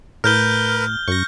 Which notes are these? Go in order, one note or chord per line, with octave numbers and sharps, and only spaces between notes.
A2 A#4 B4 F6 G6 G7
F#2 C#6 A#6